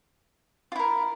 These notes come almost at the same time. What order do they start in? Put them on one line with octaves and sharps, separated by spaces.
F4 E4 A#4